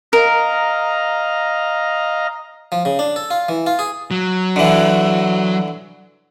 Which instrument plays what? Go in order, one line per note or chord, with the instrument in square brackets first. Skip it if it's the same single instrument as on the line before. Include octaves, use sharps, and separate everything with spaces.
[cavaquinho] A#4 [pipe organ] D#5 F5 A#5
[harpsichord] F3
C#3
D4
A4
F4
E3
F4
G#4
[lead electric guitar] F#3
[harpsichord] D3 E3